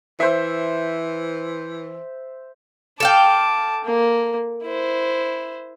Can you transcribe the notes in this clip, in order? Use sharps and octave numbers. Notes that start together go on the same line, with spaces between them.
E3 C5 E5
A4 F5 G5 A5 D6
A#3
E4 C5